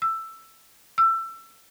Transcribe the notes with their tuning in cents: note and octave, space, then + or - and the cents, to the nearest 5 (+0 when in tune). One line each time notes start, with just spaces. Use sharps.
E6 +10
E6 +25